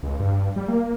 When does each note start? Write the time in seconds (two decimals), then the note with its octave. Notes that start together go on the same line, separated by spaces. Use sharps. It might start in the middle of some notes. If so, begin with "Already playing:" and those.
0.03 C#2
0.19 G2
0.56 G3
0.68 A#3